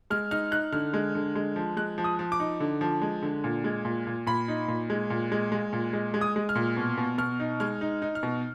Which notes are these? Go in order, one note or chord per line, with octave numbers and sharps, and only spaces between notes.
G#3 F6
D#4 F6
D#4 F#6
D3 F6
G#3
D3
G#3
F3
G#3 F#6
F3
D#6
F3
D6
D#4
D3
F3
G#3
D3
A#2
G#3
A#2
A#2
A#2 B5
D#4
A#2
G#3
A#2
G#3
G#3
A#2
G#3
G#3
D#6
G#3
F6
A#2
B2
B2
B2 F6
D#4
G#3 F6
D#4
D#4
F6
B2